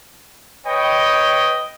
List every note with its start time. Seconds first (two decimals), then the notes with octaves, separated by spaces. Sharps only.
0.65 B4 C#5 D#5 G5